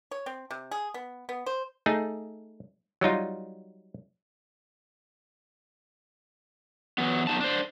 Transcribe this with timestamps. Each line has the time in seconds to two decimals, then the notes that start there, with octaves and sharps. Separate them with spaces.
0.11 C#5
0.26 C4
0.51 C3
0.71 G#4
0.94 B3
1.29 B3
1.46 C5
1.86 A3 D#4 G#4
3.01 F#3 G3 D#4 F4
6.98 E3 F#3 B3
7.27 F#2 D#3 B3 D#4 A5
7.40 D4 C5